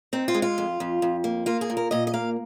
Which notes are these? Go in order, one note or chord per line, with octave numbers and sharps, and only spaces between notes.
C4 D#4
F4
G#3
F4
F2
F2
F2
A#3
A#3 F4
G#4
A#2
A#4
A#2 D#5
D#5
A#3 F5